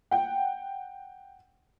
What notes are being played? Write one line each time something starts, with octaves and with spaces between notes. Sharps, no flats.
F#5 G5